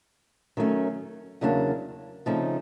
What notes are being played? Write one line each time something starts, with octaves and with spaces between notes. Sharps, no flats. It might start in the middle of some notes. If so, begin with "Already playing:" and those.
D#3 F#3 A3 C#4
E2 C#3 F#3 A#3 D4
C#3 F3 A3 C4 D#4